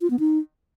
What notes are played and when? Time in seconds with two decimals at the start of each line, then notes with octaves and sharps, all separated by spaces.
0.01 F4
0.10 B3
0.19 D#4